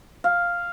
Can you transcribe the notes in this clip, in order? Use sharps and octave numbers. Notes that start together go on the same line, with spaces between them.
F5